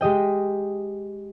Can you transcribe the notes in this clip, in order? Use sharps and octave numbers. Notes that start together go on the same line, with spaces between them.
G#3 G4 D#5 G5